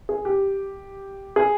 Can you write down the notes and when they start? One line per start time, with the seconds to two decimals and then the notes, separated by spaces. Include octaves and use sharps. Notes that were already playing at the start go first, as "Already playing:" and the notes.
0.09 G#4
0.25 G4
1.36 G#4